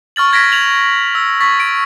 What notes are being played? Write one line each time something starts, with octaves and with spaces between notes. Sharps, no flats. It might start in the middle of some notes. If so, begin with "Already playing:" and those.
C#6 F6 A6 F#7
C#6 F6 G#6 A#6 B6 D7
G#6 F7 F#7
E6
C#6 A6 B6
D7